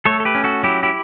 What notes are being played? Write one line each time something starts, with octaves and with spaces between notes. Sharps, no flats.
A3 A4 C#5
A4
G4 B4
C#4
F#4 A4
F#3 E4 G4
E4 G4